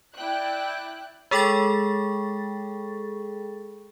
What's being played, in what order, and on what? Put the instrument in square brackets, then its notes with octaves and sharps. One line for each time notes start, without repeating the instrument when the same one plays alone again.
[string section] E4 D5 G5 F#6
[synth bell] G#3 G#4 A4 G5 C#6 A6